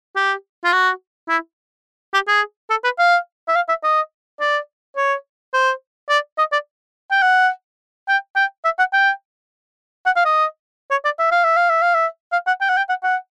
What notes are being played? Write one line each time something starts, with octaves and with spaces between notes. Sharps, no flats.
G4
F4
F#4
E4
G4
G#4
A4
B4
F5
E5
F5
E5
D#5
D5
C#5
C5
D5
D#5
D5
G5
F#5
G5
G5
E5
F#5
G5
F#5
F5
D#5
C#5
D5
E5
F5
E5
F5
E5
F5
E5
F5
F#5
G5
F#5
G5
F#5
F#5